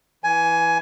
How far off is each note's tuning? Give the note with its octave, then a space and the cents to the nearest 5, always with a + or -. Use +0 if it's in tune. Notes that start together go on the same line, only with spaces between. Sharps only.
E3 +0 G#5 +15